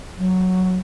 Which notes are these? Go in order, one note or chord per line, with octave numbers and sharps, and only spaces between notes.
F#3